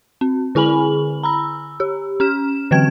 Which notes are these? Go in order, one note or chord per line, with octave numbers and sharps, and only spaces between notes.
C4
D3 E4 G#4 G#5 B5 F#7
A#5 B5 E6
G4
C#4 F6 E7
D3 E3 F#3 C4 G5 G#6